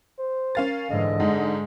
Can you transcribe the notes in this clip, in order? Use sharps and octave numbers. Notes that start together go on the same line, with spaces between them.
C5
C#4 A#4 F5 A6
G#2 D3 E3 D#5
G#2 G#3